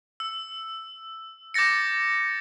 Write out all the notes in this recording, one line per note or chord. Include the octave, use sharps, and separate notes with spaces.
E6
D6 G6 A6 A#6 C#7